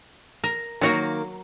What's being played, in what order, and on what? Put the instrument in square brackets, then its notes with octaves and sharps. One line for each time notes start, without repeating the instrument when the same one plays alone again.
[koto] A#4
[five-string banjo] D#3 G3 A#3 [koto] F#3 F#4 A#4